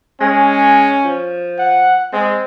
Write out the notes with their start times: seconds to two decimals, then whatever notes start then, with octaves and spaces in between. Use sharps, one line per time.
0.21 G#3 C#4
1.05 F3
1.59 F#5
2.13 G#3 C4